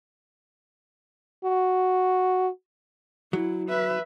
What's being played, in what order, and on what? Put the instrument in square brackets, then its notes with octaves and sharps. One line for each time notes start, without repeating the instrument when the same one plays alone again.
[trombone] F#4
[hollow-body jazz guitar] F#3 [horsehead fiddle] E4
[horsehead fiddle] B4 E5